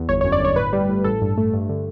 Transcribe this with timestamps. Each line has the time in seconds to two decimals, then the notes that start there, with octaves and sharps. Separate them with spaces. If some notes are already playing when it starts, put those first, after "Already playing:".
Already playing: E2
0.08 G1 C#5
0.21 C#5
0.24 F#2
0.32 D5
0.40 G1 C#5
0.56 A2 B4
0.73 G3
0.89 A2
1.04 A1 A4
1.21 G2
1.37 A3
1.53 G2
1.69 D3